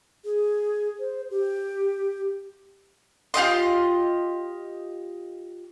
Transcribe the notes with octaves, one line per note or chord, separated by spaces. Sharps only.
G#4
C5
G4
F4 G4 D#5 C6